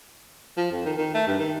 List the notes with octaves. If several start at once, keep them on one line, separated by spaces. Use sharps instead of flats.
F3
F2
D#3
D#3
A3
G2
D#3